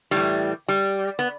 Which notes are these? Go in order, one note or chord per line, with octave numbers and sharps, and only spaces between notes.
A2 E3 G3
G3
B3